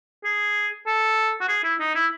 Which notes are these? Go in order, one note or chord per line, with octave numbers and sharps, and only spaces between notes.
G#4
A4
F#4
G#4
E4
D#4
E4